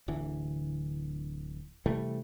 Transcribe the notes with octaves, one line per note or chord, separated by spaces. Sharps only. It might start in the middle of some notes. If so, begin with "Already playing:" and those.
D1 D3 E3
C3 E3 G3 A3